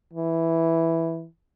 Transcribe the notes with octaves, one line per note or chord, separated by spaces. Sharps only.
E3